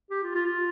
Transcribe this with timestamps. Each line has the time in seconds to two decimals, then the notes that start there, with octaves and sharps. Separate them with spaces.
0.10 G4
0.23 F4
0.35 F4
0.46 F4